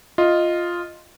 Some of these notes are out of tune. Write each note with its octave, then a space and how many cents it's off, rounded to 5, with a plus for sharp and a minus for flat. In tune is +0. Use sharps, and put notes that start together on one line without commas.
F4 +0 D#5 +0